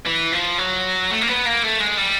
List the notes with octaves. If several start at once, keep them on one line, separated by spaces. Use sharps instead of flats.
E3
F3
F#3
A3
A#3
B3
A#3
A3
G#3
G3